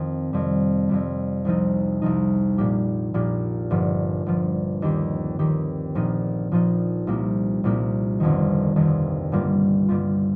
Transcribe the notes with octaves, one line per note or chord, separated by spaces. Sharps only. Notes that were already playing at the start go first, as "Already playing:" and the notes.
Already playing: F2 D#3 C4 F4
F2 C3 G3
F2 C3 G3
C2 C3 F3 D#4
C2 C3 F3 D#4
A#1 A#2 A#3 G4
A#1 A#2 A#3 G4
G1 G2 F3
G1 G2 F3
D#2 D#3 C4 G4
D#2 D#3 C4 G4
A#1 A#2 F3 D#4
A#1 A#2 F3 D#4
C2 A#2 A#3 G4
C2 A#2 A#3 G4
G1 F2 C3 D#3
G1 F2 C3 D#3
G1 G2 G3 A#3 F4
G1 G2 G3 A#3 F4